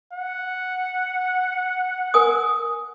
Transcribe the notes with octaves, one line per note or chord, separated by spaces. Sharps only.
F#5
A#4 G#5 D#6